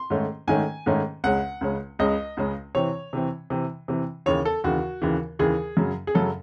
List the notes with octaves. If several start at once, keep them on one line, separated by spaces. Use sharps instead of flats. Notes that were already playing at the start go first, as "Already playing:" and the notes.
Already playing: C6
G#2 D#3 A3 C#4
G#2 D#3 A3 C#4 G#5
G#2 D#3 A3 C#4
C#2 C#3 G#3 C#4 F#5
C#2 C#3 G#3 C#4
C#2 C#3 G#3 C#4 D#5
C#2 C#3 G#3 C#4
C3 E3 C4 C#5
C3 E3 C4
C3 E3 C4
C3 E3 C4
D#2 C#3 E3 C#5
A4
D#2 C#3 E3 F#4
D#2 C#3 E3
D#2 C#3 E3 G#4
F#2 C#3 F#3
G#4
F#2 C#3 F#3 A4